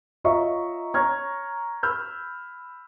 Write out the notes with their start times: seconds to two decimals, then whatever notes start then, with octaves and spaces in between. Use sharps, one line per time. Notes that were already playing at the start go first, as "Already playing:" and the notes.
0.24 F4 C#5 D#5 E5 A#5 C#6
0.94 C#5 A#5 C#6 F6 G#6
1.83 B5 E6 F6 G6